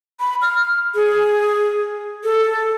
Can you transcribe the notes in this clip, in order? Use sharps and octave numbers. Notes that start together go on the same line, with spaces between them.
B5
F6
G#4
A4